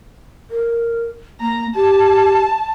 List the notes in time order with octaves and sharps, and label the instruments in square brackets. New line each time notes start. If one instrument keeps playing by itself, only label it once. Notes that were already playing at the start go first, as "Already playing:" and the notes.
[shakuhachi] A#4
[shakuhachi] A#3 [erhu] A#5
[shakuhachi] G4 [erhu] A5